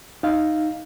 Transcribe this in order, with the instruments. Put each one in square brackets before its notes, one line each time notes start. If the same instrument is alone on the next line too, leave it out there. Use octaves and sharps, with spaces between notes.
[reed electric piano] D#4 F5